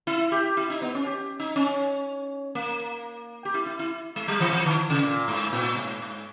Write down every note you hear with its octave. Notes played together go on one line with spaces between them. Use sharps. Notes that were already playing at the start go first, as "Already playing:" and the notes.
E4
G4
E4
D#4
B3
C#4
G4
D#4
C#4
A#3
G4
E4
E4
E4
G#3
G3
E3
E3
D#3
C#3
A#2
G#2
A#2
G#2
G#2